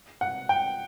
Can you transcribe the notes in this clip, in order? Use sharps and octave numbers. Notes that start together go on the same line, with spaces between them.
F#5
G5